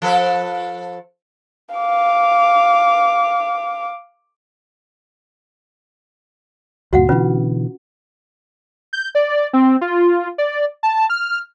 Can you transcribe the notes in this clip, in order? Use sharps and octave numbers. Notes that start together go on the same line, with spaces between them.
F3 A4 B4
F5 D6
D2 G2 A#2 F#4 F5 F#5
B2 D3 E3 C#4 F4 B4
G6
D5
C4
F4
D5
A5
F6